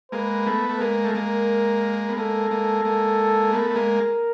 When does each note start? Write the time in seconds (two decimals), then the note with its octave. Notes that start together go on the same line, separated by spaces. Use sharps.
0.12 G#3 A#3 B4
0.46 A3 B3
0.69 A3
0.80 G#3 A#3 A#4
1.04 A3
1.15 G#3 A#3
2.08 B3
2.17 G#3 A#3 A4
2.51 G#3 A#3
2.85 G#3 A#3
3.53 A3 B3 A#4
3.70 A3
3.75 G#3 A#3